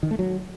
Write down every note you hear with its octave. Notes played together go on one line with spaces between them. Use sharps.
D#3
A3
F#3